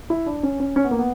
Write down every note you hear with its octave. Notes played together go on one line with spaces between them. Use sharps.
E4
D4
C#4
C#4
C#4
B3
A#3
B3